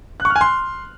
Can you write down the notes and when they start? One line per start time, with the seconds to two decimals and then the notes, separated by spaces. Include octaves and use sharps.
0.20 F#6
0.25 C#6
0.30 F6
0.36 G#5
0.41 C6